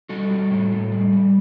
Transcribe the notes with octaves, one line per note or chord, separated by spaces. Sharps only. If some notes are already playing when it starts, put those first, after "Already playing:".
G3 F#4 A4
G3
A2
A2
G3
G3